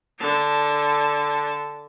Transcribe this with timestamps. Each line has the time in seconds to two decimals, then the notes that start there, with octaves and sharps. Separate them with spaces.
0.19 D3 A5